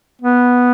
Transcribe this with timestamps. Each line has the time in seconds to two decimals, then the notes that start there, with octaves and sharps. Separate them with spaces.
0.22 B3